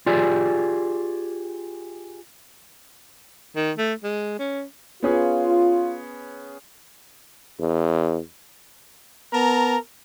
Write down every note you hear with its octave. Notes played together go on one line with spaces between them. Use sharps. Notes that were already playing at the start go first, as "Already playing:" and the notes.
F4 G4 G#4 D5
D#3
A3
G#3
C#4
B3 C#4 F4 G#4
E2
B3 A#4 A5 A#5